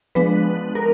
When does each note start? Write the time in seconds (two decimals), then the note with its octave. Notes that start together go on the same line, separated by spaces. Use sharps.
0.15 F3 G#3 B3 D4 B4
0.75 A#4